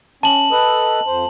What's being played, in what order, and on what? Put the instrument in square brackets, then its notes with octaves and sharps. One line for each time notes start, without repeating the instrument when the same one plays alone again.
[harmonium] C#4 [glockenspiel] A5 F#7
[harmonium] A4 B4 D#5
F2 C5